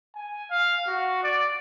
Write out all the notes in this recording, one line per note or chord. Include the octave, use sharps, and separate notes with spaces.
G#5
F5
F#4
D5